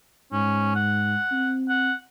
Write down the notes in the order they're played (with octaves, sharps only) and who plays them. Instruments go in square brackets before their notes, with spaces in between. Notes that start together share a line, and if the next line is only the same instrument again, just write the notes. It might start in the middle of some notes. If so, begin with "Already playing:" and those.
[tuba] G#2 [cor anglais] C#4
[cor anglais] F#5
[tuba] C4
[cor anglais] F#5